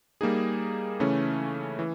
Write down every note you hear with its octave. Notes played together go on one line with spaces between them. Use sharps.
G3 A#3 D#4 G#4
C#3 E3 A3 C#4
E3